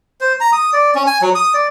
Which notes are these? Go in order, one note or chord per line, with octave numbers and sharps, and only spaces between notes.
C5
A#5
D#6
D5
C#4
G#5
F#3
D#6
D5